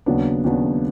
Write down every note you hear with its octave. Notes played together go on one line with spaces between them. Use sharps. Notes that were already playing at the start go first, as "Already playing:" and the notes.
D#2 C#3 F#3 B3 D4
D#2 C#3 F#3 B3 D4